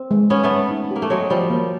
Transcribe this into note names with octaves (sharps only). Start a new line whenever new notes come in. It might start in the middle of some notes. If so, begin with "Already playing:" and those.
Already playing: C4
G#3
G#3 B3 C#4
A3 B3
G#3
D#4
A#3 G4
A3
F#3 G#3 G4
F3 G3 G4
A#3